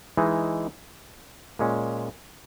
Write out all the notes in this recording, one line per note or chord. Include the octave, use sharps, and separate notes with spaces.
E3 G#3 D#4
A#2 G#3 C#4